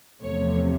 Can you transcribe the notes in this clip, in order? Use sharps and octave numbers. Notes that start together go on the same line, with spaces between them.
E2 C3 F3 A3 C#5